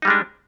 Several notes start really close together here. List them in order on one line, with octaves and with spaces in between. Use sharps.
D#4 G3 G#3 D4